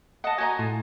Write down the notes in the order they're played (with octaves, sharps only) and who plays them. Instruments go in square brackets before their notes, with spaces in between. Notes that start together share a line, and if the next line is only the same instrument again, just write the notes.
[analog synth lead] D#5 [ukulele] F#5 A5
[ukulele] F#4 D#5 A#5 [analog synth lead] G#5
[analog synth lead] A2 [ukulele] F4